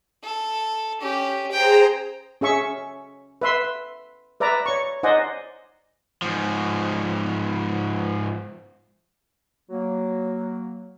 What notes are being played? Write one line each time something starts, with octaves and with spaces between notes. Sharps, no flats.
A4
C#4 G4
G#4 C5 G5 A#5
C#4 G#4 E5 C#6
B4 E5 C6
B4 D5 E5 A#5
C#5 C#6
D#4 C5 D5 D#5 F#5 G#5
G#2 F3
F#3 A#3